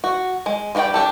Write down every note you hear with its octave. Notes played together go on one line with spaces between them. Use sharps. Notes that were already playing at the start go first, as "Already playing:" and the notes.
F#4
G#3
G3 F4 F#4 D5 G5
D4 G4 A4